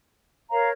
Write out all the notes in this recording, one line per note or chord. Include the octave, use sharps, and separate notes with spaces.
A#4 C#5 F5 A#5